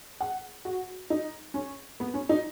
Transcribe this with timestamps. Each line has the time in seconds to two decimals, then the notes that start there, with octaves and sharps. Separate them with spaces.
0.21 F#5
0.65 F#4
1.10 D#4
1.54 C#4
2.00 B3
2.14 C#4
2.29 D#4